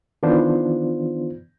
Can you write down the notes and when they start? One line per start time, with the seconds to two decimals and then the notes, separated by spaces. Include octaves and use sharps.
0.23 D#3 E3 B3 D4 F4 C5